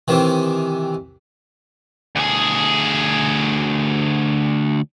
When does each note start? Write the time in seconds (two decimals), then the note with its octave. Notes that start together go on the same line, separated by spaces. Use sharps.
0.08 C3 D#3 E3
2.16 D2 G#4